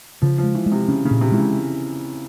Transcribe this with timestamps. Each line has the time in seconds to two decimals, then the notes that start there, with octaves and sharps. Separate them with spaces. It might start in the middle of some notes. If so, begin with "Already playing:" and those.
0.22 C#3 F3
0.38 F3
0.43 G#3
0.55 E3
0.66 G#3
0.72 C3
0.88 C#3 C#4
1.05 C#3
1.11 A#2
1.21 C3
1.32 E3 G#3
1.38 C#3